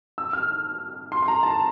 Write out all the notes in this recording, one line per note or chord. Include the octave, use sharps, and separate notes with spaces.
E6
F6
C6
C6
A#5
A5